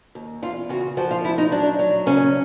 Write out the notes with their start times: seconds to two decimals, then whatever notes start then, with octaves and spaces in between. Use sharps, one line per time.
0.15 D#2
0.42 E2 F4
0.69 C#3 F#4
0.97 F3 F#4
1.11 F4
1.24 D2 E4
1.38 D#4
1.52 F#3 D4
1.79 F#3
2.06 C#3 C#4